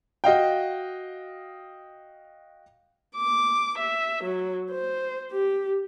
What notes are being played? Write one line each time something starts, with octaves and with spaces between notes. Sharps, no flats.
F#4 D#5 F5 G5
D6
E5
F#3
C5
G4